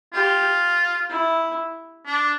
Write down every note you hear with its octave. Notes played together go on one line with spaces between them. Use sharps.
F4 G4
E4
D4